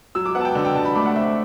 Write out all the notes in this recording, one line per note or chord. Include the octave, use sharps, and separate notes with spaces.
F#3 E6
D6
B3 F#5
A5
G5
D3
G5
D3 A5
B5
A3 D6
F#5
C4 E5
E5